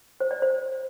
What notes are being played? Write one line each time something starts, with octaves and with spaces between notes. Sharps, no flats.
C5
D5
C5